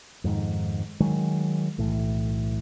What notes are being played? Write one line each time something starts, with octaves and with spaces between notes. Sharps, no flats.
F2 G#2 D#3
D#3 F#3 G#3
B1 A2 E3